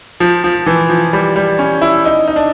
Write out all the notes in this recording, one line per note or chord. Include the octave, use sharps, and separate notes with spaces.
F3
F3
E3
F3
G3
G3
C#4
E4
D#4
D#4
D4